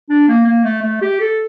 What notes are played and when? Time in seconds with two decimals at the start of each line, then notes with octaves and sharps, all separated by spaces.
0.10 D4
0.28 A#3
0.46 A#3
0.64 A3
0.82 A3
1.02 G4
1.20 A4